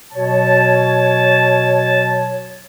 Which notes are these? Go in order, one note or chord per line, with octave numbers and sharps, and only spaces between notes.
B2 F#3 C#5 A5